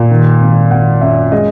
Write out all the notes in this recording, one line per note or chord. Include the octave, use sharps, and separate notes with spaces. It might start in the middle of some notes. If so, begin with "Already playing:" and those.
Already playing: A#2
D#3
G#1
G#1 F#5
F#2 E5
G#3 D#5